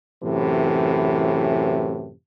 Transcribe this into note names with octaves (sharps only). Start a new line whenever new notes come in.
F#2 A2 C3 E3